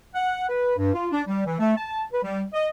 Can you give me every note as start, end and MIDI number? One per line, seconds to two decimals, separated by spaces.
0.14 0.45 78
0.49 0.73 71
0.76 0.91 43
0.93 1.07 65
1.12 1.22 62
1.26 1.45 55
1.45 1.57 52
1.59 1.74 57
1.76 2.03 81
2.11 2.22 71
2.23 2.42 55
2.53 2.68 75